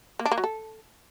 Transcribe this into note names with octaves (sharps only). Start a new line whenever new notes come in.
A#3
D4
A#3
F#3
A4